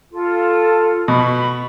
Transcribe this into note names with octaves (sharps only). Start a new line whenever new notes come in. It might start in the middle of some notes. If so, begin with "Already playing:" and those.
F4 A4
B2 B5 C#6